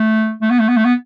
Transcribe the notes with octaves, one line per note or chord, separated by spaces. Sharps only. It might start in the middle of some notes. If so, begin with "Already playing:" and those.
Already playing: A3
A3
B3
A3
B3
A3
B3